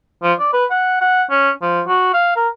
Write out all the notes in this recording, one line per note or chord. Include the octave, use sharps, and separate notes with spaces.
F3
D5
B4
F#5
F#5
C#4
F3
F#4
F5
A#4